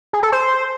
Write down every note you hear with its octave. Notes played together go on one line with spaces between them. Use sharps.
G#4
A4
C5